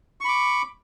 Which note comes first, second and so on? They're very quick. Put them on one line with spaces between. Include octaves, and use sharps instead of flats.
C#6 B5 D6